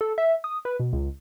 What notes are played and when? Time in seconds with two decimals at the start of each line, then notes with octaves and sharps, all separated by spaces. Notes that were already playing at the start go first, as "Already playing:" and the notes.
0.01 A4
0.18 E5
0.44 D#6
0.65 B4
0.80 B2
0.93 C#2